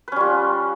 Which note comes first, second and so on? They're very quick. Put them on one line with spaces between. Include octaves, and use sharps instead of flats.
B4 C#4 G3 F4